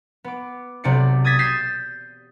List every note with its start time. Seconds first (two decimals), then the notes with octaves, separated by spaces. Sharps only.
0.24 B3 D6
0.84 B1 C3 D5 C#7
1.24 D#6 G#6 A6 B6
1.39 G6 A6 B6 C7 D#7 E7